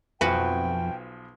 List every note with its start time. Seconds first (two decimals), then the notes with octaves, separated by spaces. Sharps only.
0.21 B1 F2 F3 F#4 B4 G5 G#5